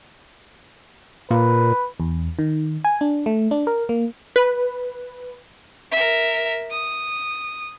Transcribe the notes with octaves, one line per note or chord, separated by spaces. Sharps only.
A#2 B4
E2
D#3
G#5
D4
A3
D4
A#4
A#3
B4
A#4 E5
D#6